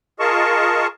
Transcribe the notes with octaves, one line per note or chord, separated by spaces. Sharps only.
F4 G#4 A#4 D#5 A5 C#6